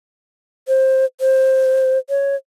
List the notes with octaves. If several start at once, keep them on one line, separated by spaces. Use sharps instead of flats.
C5
C5
C#5